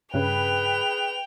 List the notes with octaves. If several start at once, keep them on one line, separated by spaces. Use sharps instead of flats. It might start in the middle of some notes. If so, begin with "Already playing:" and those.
G2 C#3 G#4 B4 G5 F7